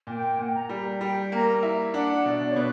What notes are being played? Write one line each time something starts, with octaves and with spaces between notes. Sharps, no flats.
A#2 G5
A#2 F#5
G5
A#5
G3
G3 G5
A#3 A#5
E4
D4 F#5
B2 D5
C#5
B2 B4